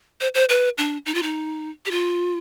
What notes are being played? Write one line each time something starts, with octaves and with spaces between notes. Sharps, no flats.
C5
C5
B4
D4
D#4
F4
D#4
G4
F4